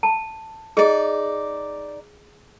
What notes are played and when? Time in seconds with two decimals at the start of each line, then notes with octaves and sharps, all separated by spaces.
0.03 A5
0.77 D#4 G#4 D5